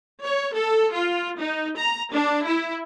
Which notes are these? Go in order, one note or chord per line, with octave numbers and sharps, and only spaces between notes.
C#5
A4
F4
D#4
A#5
D4
E4